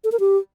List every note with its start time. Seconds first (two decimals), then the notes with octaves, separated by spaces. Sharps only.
0.04 A4
0.12 A#4
0.20 G4